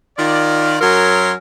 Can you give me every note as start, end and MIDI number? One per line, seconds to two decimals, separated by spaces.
0.17 0.77 51
0.17 0.77 65
0.17 0.77 74
0.81 1.32 42
0.81 1.32 54
0.81 1.32 61
0.81 1.32 70
0.81 1.32 82
0.81 1.32 84